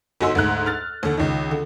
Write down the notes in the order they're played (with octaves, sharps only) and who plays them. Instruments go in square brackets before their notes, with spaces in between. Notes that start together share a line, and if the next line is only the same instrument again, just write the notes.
[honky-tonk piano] G1 D#4 F#4 G#5 C6 E6
D2 G#2 F#6
F6 A6
D#2 D3
C#2 D#3
D3